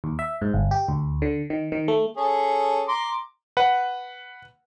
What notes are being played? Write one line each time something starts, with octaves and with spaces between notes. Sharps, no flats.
D#2
E5
G#2
G1
G4
D2
D3
D#3
D#3
A3
C#4 G#4 A4
A#5 C6 D6
B4 F#5